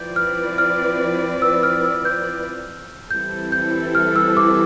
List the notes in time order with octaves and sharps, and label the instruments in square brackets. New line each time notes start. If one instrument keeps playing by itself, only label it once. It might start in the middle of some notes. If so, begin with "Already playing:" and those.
Already playing: [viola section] F3 C4 E4 B4 D5 [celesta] G6
[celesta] F6
F6
E6
F6
E6
G6
[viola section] E3 G3 C4 E4 A4 [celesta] G6
[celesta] G6
F6
E6
D6